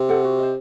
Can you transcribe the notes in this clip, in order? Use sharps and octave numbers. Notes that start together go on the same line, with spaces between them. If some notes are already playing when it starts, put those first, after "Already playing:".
Already playing: C3
A4 C5 F#5
F#4
C5 D#5